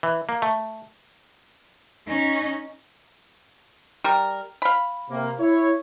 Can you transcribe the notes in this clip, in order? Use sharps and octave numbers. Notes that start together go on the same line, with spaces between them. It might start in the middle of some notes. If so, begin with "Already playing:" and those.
E3
A#3
A3
C#4 D#4
G3 A#4
F5 B5
C3 A#3
E4 C#5